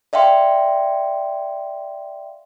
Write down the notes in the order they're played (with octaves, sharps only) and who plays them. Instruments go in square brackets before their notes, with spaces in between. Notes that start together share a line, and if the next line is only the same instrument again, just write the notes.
[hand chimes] D5 E5 F5 G5 C6